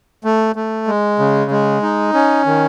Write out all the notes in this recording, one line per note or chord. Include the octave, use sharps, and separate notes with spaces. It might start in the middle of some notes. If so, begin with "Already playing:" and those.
A3
A3
G#3
C#3
G#3
D#4
C#4
D#3